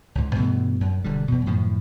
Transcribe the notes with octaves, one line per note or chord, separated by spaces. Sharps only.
C#2 G#2
G2 B2 E3 A3
F#2
E1 D3 G3
E2 B2
F#2 A2 D#3 F3